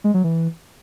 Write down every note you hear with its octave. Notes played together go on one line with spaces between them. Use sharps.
G#3
F#3
E3